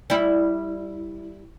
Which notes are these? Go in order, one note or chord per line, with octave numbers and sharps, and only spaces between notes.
G3 E4